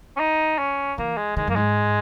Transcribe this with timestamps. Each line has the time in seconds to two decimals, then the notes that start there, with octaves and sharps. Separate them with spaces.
0.16 C#4
0.20 D#4
0.58 C#4
0.98 E3 A#3
1.17 G#3
1.37 D#3 G#3
1.47 F#2 A#3
1.56 G#2 G#3